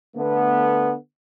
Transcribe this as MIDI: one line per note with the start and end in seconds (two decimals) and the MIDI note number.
0.16 0.94 50
0.16 0.94 57
0.16 0.94 59